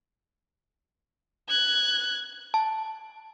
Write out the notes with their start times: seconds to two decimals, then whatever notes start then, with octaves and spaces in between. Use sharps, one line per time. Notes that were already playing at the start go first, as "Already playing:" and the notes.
1.49 F#6 G#6
2.54 A5